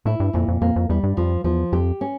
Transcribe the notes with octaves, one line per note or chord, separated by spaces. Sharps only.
A2 E4
G2
F2 A#2
F2
F2 A#3
F2
E2 G3
G2
F2 F3
E2 F3
F2 G4
C#4